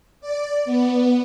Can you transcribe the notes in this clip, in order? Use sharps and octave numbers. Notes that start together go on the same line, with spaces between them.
D5
B3